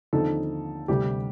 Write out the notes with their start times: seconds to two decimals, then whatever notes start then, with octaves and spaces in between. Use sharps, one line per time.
0.13 D#2 D3 F3 C4 D#4 A4
0.88 D2 C3 G3 G4